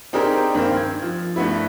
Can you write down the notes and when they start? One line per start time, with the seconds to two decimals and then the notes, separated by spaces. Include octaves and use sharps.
0.13 C4 D4 D#4 G4 G#4 A#4
0.54 G2 D#3 A#3 C4
0.77 G#6
1.02 F3
1.36 G2 A3 B3 E4